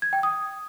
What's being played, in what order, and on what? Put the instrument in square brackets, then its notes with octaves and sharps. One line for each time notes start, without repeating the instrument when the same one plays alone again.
[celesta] G#6
G5
D#6